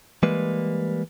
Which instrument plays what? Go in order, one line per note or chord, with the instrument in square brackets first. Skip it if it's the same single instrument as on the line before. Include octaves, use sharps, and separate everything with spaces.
[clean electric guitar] E3 G3 G#3 A#3 B4